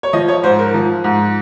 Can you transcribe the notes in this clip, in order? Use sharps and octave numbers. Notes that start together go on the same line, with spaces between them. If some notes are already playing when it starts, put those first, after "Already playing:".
C#5
F3 D#5
C#5
G#2 C5
A#4
F3
G#2